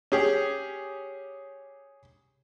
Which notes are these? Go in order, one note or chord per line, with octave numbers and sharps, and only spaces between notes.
C#4 G4 G#4